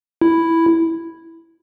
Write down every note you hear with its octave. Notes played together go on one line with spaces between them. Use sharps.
E4